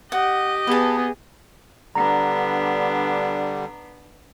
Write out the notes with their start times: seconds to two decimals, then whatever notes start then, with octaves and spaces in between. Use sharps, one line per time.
0.12 G4 D#5 F#5
0.67 B3 G#4 B4 A5
1.95 D3 G3 B3 D4 A#5